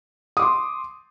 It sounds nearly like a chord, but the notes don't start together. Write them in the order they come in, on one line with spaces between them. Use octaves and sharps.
D#6 D6 C6